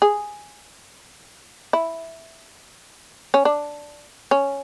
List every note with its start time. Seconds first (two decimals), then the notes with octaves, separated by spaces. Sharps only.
0.02 G#4
1.73 E4
3.34 C#4
3.45 D4
4.31 C#4